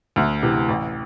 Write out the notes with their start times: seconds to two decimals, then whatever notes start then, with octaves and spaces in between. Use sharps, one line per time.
0.16 D2
0.42 C3 E3
0.68 A1